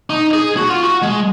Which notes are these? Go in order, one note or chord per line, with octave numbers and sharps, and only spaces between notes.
D#4
G#4
F#4
F4
F#4
G#3